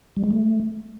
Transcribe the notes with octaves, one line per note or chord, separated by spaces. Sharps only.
G3
G#3
A3